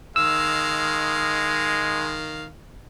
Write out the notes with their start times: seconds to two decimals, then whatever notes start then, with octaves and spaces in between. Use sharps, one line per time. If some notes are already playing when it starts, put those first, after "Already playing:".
0.16 D#3 G#3 F5 E6